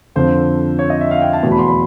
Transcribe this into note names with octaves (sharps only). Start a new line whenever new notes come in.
F2 D3 F3 C5
C#5
D#5
E5
F5
G5
A5
E2 B2 F#3 A3
B5
C6
B5